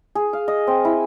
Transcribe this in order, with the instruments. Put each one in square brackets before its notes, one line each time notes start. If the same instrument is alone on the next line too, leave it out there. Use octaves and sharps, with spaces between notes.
[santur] G#4
F5
D#5
C4
E4